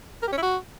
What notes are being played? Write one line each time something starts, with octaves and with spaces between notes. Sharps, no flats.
A#4
G4
C#4
E4
F#4